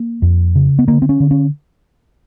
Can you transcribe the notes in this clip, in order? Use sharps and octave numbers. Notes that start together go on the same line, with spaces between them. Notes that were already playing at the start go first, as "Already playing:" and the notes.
Already playing: A#3
F2
C#3
B3
D3 A#3
C4
C#4
D3
C#4